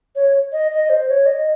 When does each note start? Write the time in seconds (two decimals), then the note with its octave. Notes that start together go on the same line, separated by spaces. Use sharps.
0.16 C#5
0.52 D#5
0.71 D#5
0.90 C5
1.09 C#5
1.26 D#5